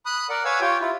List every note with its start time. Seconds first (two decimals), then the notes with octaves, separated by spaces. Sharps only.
0.06 B5 D#6 F#6
0.29 A#4 D5 F#5
0.45 B4 C#5 F5 F#5 G#5 E6
0.61 F4 G4 C#5 G5
0.81 E4 F4